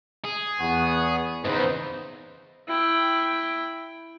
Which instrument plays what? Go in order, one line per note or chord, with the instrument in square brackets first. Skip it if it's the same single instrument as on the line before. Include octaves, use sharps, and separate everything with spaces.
[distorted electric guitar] G#4
[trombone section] E2 [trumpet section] B3 F#5 C#6
[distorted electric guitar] E2 G#2 [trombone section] C#3 B4 C5 [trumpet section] D#4
[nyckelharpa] E4 G5